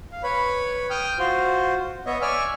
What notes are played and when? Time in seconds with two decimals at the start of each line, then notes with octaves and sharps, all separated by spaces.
0.12 F5
0.23 B4 C#5 B5
0.90 G5 D#6 F6 G6
1.19 F4 F#4 C5
2.06 B3 C#5 D#5 E5
2.22 C#5 D5 E5 G#5 E6 F6